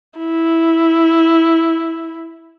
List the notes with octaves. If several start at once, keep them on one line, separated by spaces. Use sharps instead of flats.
E4